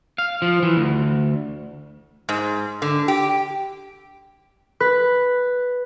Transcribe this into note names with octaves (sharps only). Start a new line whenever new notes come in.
F5
F3
E3
D2
G#2
D3
G4
B4